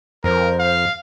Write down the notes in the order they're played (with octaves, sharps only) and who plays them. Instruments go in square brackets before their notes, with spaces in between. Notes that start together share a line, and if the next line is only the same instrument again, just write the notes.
[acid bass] F2 [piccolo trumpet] A#4 [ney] C5
[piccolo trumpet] F5